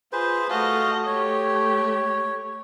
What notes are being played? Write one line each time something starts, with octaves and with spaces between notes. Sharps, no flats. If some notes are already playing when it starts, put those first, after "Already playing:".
F4 G#4 B4 C5
A3 F#4 D#5 F5 A5
A3 G4 C#5